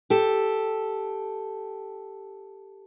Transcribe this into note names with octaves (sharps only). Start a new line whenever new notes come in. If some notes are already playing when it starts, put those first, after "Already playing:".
G4 A4